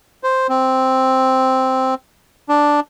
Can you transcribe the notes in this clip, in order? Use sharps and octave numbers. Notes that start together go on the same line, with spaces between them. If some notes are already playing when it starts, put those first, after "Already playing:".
C5
C4
D4